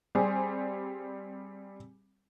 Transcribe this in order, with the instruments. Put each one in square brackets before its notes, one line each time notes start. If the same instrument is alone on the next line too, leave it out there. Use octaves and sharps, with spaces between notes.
[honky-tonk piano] G3 C4 G4 G#4